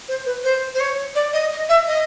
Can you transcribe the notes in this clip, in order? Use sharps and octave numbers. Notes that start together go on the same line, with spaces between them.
C5
B4
C5
C5
C#5
D5
D#5
D#5
E5
D#5